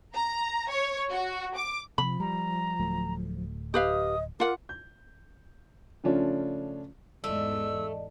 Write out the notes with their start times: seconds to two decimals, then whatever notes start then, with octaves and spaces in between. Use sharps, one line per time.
0.15 A#5
0.70 C#5
1.12 F#4
1.57 D6
1.98 C3 F3 B5
2.20 G3 A#5
2.79 D1 F#3 A3
3.74 G4 B4 D#5 F5 D#6
4.40 F4 A#4 F#5 D6
4.69 G6
6.04 C#3 F3 A3 C#4 D4 F4
7.24 E2 G#2 A3 D5 D#5 E6